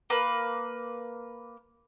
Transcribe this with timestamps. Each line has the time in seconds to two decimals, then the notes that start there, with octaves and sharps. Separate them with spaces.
0.10 A#3 B4